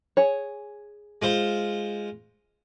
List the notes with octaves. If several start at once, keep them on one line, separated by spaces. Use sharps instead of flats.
G#4 C#5
G#3 F4 C5